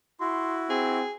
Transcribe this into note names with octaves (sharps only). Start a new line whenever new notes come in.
E4 F#4 C6
C4 G#4